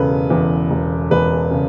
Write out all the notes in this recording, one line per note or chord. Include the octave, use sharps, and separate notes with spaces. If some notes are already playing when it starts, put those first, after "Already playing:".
Already playing: E1 C#3 A4 B4
E2
E1
E1 B4
C#3